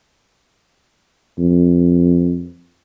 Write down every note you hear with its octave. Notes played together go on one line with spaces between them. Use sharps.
F2